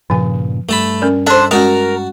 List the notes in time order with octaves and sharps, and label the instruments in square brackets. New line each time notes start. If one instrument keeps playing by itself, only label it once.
[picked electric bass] G2 A#2 C#3 [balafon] F3 G#5
[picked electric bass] G2 [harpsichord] A3 A5 B5
[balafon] C#4 A#4 D5
[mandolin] D4 C5 [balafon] A4 [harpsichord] E5
[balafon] G#3 C#4 [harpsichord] F#4 A5 [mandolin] A#4